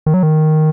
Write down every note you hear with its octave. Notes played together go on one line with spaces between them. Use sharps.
D#3
F#3
D#3